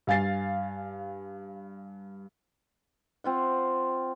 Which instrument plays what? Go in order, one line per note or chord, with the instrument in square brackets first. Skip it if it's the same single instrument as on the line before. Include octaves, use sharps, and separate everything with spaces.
[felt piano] G2 F5 G#5 A6 C7
[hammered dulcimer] C4 F4 F#5